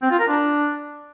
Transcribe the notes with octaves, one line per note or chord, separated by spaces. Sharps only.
C4
F4
A#4
D4